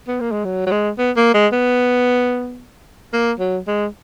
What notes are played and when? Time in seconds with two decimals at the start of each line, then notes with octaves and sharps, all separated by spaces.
0.08 B3
0.20 A#3
0.32 G#3
0.45 F#3
0.66 F#3
0.71 G#3
0.99 B3
1.17 A#3
1.34 G#3
1.52 B3
3.13 A#3
3.39 F#3
3.67 G#3